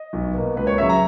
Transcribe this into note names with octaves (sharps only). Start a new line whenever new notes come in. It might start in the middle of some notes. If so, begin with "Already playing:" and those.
Already playing: D#5
B1
B2 A#3
C#2 B4
C#5
C#3 F#3 E5
A#5